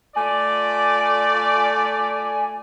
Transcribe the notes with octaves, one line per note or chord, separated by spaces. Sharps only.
A3 F4 D5 G#5